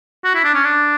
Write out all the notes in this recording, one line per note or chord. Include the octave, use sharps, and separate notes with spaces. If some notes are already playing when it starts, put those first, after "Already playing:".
F#4
E4
D4
C#4
D4